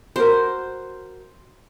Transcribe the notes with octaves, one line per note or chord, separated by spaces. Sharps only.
F#4 A#4 C5